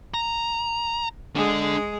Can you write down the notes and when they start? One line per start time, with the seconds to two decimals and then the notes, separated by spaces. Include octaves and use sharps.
0.14 A#5
1.35 G#3 D4 G#4 A4